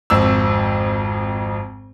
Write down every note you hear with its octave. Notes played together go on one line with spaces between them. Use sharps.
G#1 F2 E6